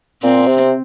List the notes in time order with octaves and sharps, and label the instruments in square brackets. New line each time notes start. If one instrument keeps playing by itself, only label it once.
[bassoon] A#2 [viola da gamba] C4
[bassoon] C3